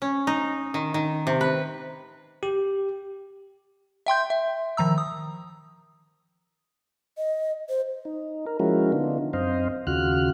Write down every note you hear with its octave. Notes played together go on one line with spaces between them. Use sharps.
C#4
D#4
D#3
D#3
C3
B4
G4
E5 G5 C6 G6
E5
D#3 F3 A#5 E6
D#6
D#5
C5
D#4
A#4
F3 G#3 C#4 E4 F#4 A#4
D3 B3 D4 D#4 F4
F#2 C4 C5 D#5 F5
D#2 C#3 F4 F#4 F6 F#6